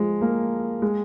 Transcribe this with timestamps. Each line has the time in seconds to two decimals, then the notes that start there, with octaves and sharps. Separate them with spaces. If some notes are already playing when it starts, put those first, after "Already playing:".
Already playing: F3 G#3
0.21 A#3
0.82 G#3